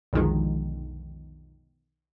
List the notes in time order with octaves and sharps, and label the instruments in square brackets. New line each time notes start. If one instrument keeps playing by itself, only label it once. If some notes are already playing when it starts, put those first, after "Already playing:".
[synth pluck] B1 F2 D3 D#3 F3 G#3